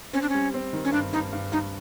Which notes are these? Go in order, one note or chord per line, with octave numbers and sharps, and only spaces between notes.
C4 C#4
D4
C#4
G3
C4
D#3
C#4
G2 D4
G2 D#4
G2
G2 D#4